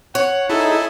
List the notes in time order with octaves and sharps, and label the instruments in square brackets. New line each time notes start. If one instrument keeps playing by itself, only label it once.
[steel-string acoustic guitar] C#5 [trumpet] F#5
[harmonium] D#4 [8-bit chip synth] E4 G#4 [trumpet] A4